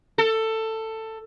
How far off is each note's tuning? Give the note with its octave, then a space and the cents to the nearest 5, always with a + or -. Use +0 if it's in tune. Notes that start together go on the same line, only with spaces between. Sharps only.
A4 +15